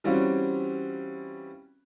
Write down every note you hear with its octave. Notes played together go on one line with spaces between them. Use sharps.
E3 G3 C4 C#4 F4 F#4